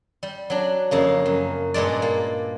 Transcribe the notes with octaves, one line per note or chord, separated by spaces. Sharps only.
G3
F#3 D4
F2 C#3 A#3
F#2
G2 A#2 G#3 D5
A#3